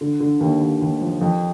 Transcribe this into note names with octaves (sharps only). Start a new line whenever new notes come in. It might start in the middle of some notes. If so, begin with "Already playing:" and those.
D3
D3
D#2
D#2
D#2
F3
F2